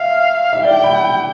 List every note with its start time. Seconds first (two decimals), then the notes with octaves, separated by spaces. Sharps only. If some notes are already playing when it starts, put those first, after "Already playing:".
Already playing: E5 F5
0.53 E5
0.64 D5 G5
0.84 B5